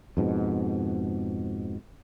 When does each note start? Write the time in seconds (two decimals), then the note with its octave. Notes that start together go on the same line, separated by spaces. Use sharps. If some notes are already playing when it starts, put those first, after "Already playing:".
0.17 F2 G#2 B2